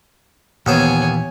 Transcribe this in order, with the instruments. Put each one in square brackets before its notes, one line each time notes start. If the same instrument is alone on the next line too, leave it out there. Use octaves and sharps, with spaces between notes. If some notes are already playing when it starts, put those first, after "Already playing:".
[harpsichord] D#2 B3 C5 [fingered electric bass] A#2 E3 [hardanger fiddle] C#5 G#5